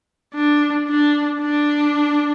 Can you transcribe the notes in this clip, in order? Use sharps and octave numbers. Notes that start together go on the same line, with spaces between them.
D4
D4
D4